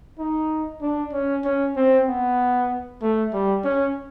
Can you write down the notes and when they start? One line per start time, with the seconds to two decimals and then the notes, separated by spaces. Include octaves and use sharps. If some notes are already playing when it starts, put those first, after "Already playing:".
0.19 D#4
0.82 D4
1.13 C#4
1.44 C#4
1.76 C4
2.07 B3
3.02 A3
3.33 G3
3.64 C#4